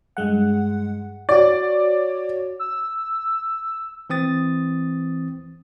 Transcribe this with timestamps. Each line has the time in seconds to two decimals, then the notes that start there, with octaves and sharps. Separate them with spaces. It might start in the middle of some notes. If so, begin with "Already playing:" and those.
0.17 G2 G#3 F#5
1.29 F#4 C#5 D5
2.59 E6
4.10 E3 C4 D#6 A6